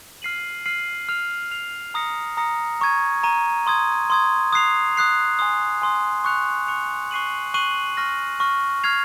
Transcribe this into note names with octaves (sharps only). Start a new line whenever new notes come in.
F6 C7 D#7 F#7
F6 C7 D#7 F#7
F6 C7 F7
F6 C7 F7
A#5 D#6 A#6 C#7
A#5 D#6 A#6 C#7
A#5 C#6 G#6 D#7
A#5 C#6 G#6 D#7
C6 D#6 G#6
C6 D#6 G#6
D#6 F#6 C7 F7
D#6 F#6 C7 F7
G#5 C6 D#6
G#5 C6 D#6
C#6 F#6 C#7 F7
C#6 F#6 C#7 F7
C#6 F#6 C7 D#7 F#7
C#6 F#6 C7 D#7 F#7
C#6 F6 A#6
C#6 F6 A#6
F6 G#6 C7 F7